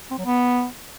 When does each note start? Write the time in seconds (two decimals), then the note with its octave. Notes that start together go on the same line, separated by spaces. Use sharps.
0.11 C4
0.18 F#3
0.25 B3